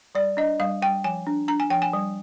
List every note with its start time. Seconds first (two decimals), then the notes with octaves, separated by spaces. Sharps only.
0.15 G3 D5
0.37 D4 D#5
0.59 G3 F5
0.82 G3 G5
1.04 F3 G#5
1.27 D4
1.48 D4 A#5
1.60 G#5
1.70 F3 G5
1.82 G#5
1.93 G3